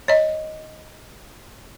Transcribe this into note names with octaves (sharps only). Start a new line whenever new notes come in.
C#5 D#5